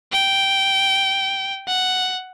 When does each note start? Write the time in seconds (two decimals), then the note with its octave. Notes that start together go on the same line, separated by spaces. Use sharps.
0.13 G5
1.68 F#5